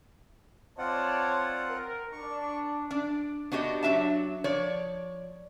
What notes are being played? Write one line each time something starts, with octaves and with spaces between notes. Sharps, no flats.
C4 F4 C#5 D5 F#5 A5
A#4
D4 C#6
D4
B3 D4 F#4 G4 D#5
F#3 D4 E5 A5
F3 C#5 D5